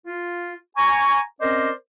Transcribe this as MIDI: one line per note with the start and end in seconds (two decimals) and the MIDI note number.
0.06 0.54 65
0.77 1.20 80
0.77 1.20 82
0.77 1.20 85
1.41 1.70 60
1.41 1.70 61
1.41 1.70 70
1.41 1.70 72
1.41 1.70 74
1.41 1.70 75